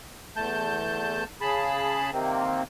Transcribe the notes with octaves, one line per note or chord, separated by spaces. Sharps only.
E2 A3 A5 G6
C#3 G#4 A5 B5
C3 D#3 A#3 C4